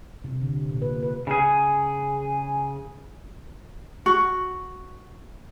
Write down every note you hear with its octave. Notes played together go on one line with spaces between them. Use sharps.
C3
D3
A#2
B4
B4
C#3 G#4
F#4